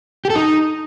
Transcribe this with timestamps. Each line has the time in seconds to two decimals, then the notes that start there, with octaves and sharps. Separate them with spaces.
0.25 G4
0.30 A4
0.35 D#4